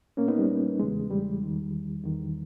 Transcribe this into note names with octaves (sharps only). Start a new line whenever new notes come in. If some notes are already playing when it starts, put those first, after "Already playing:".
A#2 A#3 C#4
B3 D#4
G3
E2 C#3 E3 G#3
G3
E2 D#3
E2 D#3